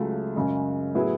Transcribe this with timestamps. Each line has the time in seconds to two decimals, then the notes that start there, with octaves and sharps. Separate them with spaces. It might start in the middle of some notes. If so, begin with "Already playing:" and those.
Already playing: C#2 C#3 F#3 A3
0.36 F#2 C#3 G#3
0.95 A2 F#3 B3 E4 G#4